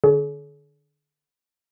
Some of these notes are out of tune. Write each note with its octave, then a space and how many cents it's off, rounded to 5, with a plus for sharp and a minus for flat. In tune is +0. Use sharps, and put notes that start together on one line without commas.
D3 +20 G#4 +40 C#5 +40